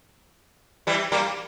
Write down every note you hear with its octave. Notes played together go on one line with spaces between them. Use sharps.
E3 G3
G3 A#3